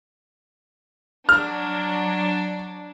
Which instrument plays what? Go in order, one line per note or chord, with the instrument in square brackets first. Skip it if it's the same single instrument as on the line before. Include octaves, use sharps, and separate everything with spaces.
[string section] F#3 D4 [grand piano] F6